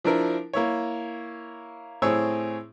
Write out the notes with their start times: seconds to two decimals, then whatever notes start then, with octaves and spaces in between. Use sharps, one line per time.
0.04 F3 D4 E4 A#4
0.53 A#3 E4 C#5
2.02 A2 C4 G#4 C#5 C#6 E6